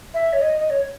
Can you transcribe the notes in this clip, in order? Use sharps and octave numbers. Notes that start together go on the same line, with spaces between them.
E5
C#5
D#5
D#5
C#5